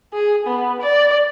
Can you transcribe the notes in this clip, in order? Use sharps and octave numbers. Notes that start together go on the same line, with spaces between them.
G#4
B3
D5